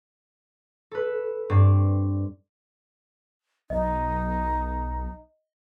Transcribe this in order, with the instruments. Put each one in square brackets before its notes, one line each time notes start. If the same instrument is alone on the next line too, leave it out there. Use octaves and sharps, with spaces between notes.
[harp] A4 B4
G2 C4 D5
[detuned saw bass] B1 [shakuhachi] D#4 [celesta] D#5